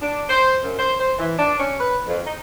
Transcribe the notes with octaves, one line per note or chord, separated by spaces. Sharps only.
D4
C5
F#2
C5
C5
E3
D4
C#4
B4
F2
D#4